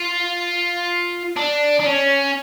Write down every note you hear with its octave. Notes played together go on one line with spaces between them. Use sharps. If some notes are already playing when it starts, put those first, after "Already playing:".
Already playing: F4
D4
D4
C#4